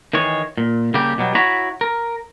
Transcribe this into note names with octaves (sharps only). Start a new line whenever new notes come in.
D#3 E3 G#3 C#5
A#2
C#3 G3 A#3 G4
B2 F#3 G3
E4 F#4 C#5 F#5 A#5 B5
A#4